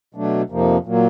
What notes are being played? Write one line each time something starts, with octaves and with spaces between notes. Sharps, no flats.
B2 F#3 A3 D4
F2 C3 F3 A#3 D#4
A#2 F#3 A#3